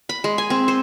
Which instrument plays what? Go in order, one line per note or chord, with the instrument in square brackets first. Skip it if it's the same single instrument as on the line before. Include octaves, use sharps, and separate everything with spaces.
[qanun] B5
G#3
G#5
C4
C5